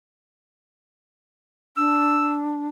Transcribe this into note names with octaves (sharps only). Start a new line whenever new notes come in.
D4 E6